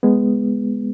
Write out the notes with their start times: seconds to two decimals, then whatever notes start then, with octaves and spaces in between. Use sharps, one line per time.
0.03 G#3 B3